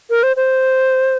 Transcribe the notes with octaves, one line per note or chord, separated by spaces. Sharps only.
A#4
C5
C5